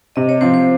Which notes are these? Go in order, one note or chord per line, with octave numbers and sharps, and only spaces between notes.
C3 D#5
C#5
F3 C4 C5
C5